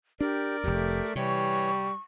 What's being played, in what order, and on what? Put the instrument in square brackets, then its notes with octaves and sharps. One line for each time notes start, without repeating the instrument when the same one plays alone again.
[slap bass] D4 [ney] G4 [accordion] A#4 D5
[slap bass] F1 F2 [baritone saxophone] A3 [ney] G4
[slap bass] C3 [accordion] E3 C#5 [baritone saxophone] G3 [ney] C#6